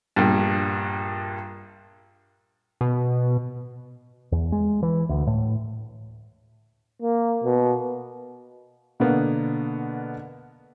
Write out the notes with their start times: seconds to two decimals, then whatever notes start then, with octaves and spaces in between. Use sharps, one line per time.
0.16 A#1 G2
2.81 B2
4.32 E2
4.52 G#3
4.83 E3
5.09 D2
5.27 A2
7.02 A#3
7.44 B2
9.00 B2 D3 A#3 B3